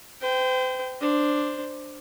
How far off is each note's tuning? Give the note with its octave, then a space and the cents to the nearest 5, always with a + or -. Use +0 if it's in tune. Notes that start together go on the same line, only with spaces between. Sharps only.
C5 -40 G5 +0
D4 +5 C5 +0